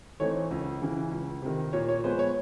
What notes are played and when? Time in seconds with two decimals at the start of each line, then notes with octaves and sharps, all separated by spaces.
0.20 E3 A3 C4 D#4 C#5
0.51 C#2
0.82 C#3 E3
1.11 C#2
1.42 C3 D#3
1.73 A#2 C#5
1.88 C#5
2.04 F3 G#3 B3 C5
2.19 C#5